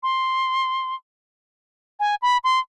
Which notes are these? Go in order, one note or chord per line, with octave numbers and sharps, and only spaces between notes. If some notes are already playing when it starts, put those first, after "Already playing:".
C6
G#5
B5
C6